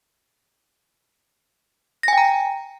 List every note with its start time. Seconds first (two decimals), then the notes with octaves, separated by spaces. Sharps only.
2.03 A#6
2.08 G#5
2.13 G5
2.18 A#5